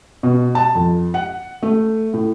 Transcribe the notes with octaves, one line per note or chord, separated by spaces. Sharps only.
B2
A5
F2
F#5
A3
A2